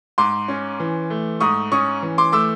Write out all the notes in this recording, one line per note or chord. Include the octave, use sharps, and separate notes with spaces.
G#2 C6 D6
C#4
E3
A3
G#2 C#6 D#6
C#4 C#6 D#6
E3
C6 D6
A3 D6 E6